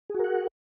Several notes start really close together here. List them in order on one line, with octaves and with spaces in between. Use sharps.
G#4 F#4 A#4 F#5